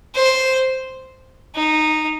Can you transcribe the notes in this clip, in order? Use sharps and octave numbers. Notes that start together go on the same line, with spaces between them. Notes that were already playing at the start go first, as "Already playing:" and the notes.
C5
D#4